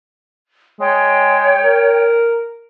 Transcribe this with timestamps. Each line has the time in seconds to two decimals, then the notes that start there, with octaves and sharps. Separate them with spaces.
0.80 G#3 C#5 G5
1.64 A#4